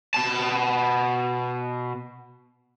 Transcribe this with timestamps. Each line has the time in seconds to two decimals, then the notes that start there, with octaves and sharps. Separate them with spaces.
0.14 B2 A5